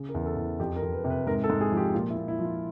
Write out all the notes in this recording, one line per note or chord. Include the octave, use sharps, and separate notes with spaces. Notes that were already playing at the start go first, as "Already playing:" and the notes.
Already playing: C#3
A#4
E2
A4
E2
F2 G4
A#4
F2
B4
C3
B4
G#2 A#4
A4
G#2
G#4
F3
G4
A#2 F4
E4
A#2
E4
F3
F4